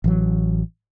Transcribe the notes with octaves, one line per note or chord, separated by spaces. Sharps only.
A1 E3 F#3